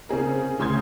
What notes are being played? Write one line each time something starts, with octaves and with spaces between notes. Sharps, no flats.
C#3 C4 G#4 A#4
D2 C#3 C6 D#6 G6 G#6